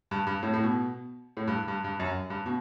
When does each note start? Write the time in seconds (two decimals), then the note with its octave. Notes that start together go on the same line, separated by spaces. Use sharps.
0.11 G2
0.27 G2
0.43 A2
0.53 A2
0.63 B2
1.37 A2
1.48 G2
1.68 G2
1.84 G2
2.00 F#2
2.30 G2
2.46 B2